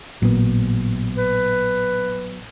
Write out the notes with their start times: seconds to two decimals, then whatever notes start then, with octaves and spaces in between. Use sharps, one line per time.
0.22 A1 A#2 F#3 B3
1.17 B4